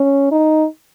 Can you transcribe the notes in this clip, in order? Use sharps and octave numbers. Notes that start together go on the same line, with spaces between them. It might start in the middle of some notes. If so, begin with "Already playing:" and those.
Already playing: C#4
D#4